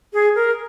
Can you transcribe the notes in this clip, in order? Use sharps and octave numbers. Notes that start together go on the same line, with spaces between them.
G#4
A#4